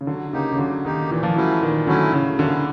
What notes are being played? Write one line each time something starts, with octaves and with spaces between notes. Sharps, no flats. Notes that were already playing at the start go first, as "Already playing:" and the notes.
C#3
D3 F#3
C#3 A#3 D#4 G4
C#3
D3 F#3
D#3 A#3 D#4 G4
A#2 E3
F3
E3 F#3 A3 C#4 E4
A#2 D#3
D3 F#3 A3 C#4 E4
A2 C#3
D3 F#3 A#3 C#4 E4